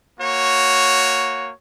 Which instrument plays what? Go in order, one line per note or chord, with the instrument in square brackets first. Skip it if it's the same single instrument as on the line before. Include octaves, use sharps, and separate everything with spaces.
[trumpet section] A#3 F#4 C#5